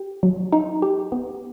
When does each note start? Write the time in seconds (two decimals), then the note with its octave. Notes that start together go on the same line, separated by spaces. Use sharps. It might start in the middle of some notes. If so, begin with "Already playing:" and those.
Already playing: G4
0.23 F#3
0.53 D#4
0.82 G4
1.12 B3